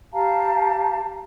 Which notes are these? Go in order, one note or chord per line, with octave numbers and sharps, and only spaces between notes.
G4 F5 A5 A#5